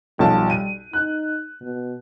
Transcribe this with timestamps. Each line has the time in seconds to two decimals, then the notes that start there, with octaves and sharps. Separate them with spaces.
0.19 B1 F3 G3 A5
0.50 D#7
0.93 D#4 F#6
1.61 B2